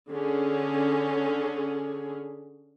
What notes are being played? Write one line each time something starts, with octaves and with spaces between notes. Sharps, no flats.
D3 C#4 G#4